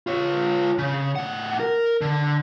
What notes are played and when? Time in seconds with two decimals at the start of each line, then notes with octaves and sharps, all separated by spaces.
0.07 F4 C#5
0.78 C#3
1.16 A2 F#5
1.60 A#4
2.01 D3